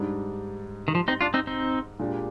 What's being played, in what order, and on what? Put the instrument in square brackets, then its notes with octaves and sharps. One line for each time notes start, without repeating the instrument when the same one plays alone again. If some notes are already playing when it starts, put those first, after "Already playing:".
Already playing: [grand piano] G#2 G3 D4
[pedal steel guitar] D#3
F3
C4 D#4
D4 F4
C4 D#4
C4 D#4
[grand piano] A#2 G#3 D4 G4